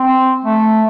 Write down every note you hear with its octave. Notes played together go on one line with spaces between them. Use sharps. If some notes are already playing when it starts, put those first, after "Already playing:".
Already playing: C4
A3